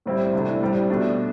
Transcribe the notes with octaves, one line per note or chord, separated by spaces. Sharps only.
A2 G3 C4 E4
C3 E3 A3 D4
A2 G3 C4
B2 A3 D4